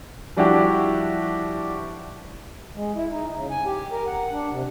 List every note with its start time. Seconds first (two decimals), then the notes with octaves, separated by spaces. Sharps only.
0.37 F3 G3 D4 E4 F#4 G4
2.75 G#3
2.95 E4
3.11 D#4
3.34 C#3
3.51 G#5
3.65 G4
3.92 A#4
4.07 F#5
4.32 D4
4.50 C3